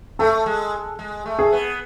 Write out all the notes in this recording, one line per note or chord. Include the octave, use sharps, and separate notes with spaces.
A3 A4
G#3
G#3
A3
G#4
B3